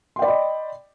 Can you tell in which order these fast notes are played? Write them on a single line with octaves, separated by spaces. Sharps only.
C6 G5 D5 B5 D#5